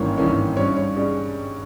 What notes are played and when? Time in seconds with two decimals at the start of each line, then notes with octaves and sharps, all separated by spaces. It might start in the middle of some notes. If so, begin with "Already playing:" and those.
Already playing: G#1 G2 E3 A#3 C#4 C#5
0.18 G#1 G2 E3 A#3 C#4
0.56 G2 G3 C#4 C#5
0.77 C#5
0.96 G3 C#4 G#4